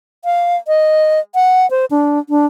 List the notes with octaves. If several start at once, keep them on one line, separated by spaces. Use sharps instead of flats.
F5
D#5
F#5
C5
D4
D4